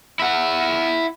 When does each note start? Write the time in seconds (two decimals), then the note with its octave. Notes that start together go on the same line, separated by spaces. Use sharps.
0.20 E4 F#5